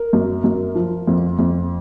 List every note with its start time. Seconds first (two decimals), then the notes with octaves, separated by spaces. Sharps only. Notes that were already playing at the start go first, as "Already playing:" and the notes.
Already playing: A#4
0.13 F#2
0.44 F#2
0.75 F3
1.07 F2
1.39 F2